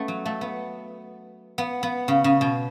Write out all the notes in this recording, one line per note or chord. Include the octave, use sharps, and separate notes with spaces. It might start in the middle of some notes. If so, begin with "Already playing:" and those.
Already playing: A3 B3 C#4
F#3
A3
B3
B3
B3
C#3
C#3
B2